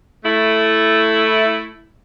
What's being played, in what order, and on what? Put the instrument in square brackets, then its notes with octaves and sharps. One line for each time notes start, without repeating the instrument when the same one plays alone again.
[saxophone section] A3 E4